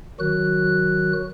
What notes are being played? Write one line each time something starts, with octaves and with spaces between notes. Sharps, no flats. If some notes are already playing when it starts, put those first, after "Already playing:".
D#3 F#3 F#4 F#6